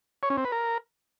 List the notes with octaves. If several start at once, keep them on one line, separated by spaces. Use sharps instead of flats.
C#5
C#4
C4
B4
A#4